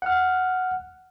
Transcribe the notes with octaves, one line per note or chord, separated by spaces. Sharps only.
F#5 F6